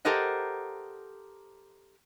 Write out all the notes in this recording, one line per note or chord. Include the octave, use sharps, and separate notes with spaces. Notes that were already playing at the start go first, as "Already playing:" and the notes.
G4 A4 A#4 C5 D#5 F#5